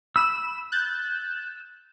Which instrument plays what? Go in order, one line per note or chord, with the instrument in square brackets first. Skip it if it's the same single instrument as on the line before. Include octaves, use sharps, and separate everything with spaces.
[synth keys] B5 E7 [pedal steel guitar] E6
[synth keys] F#6 G6 A6